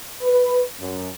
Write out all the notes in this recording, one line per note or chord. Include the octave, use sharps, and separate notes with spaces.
B4
F#2